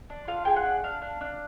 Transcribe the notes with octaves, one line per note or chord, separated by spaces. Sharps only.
D4
F4 F5
G#4 G5
F#5
D4
D4 F5
D4
D4